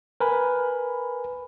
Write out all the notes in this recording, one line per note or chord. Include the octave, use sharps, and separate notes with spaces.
A#4 B4 G#5 B5